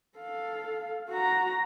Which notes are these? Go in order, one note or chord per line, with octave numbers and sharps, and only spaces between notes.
A4 F5
F#4 A#5